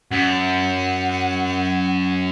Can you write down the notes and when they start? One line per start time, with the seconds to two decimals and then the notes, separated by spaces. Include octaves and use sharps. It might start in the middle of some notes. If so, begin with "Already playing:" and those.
0.11 F#2 F#5